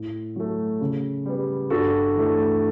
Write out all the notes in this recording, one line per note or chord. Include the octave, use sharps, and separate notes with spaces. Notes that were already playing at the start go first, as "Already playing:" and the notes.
Already playing: A2
F#3 A3
C#3
G3 B3
G2 F#4 A4
E3 A3